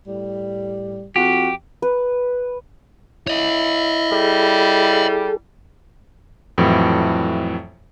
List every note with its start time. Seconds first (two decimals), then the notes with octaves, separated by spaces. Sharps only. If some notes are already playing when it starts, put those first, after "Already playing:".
0.07 A2 G3
1.16 F2 F#4 G4
1.82 B4
3.27 E4 C#5 D#5
4.12 G3 G#4 A4
6.58 F2 A2 E3 F#3